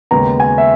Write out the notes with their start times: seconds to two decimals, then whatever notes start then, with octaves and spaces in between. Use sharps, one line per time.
0.11 D#2 C#3 G#3 B3 A#5
0.40 G#5
0.58 E5